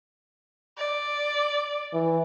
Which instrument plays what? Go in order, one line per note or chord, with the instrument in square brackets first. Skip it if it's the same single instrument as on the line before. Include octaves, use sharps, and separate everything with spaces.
[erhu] D5
[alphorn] E3